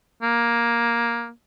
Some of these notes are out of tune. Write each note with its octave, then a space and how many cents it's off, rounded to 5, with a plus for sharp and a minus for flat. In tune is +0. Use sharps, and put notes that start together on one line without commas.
A#3 +10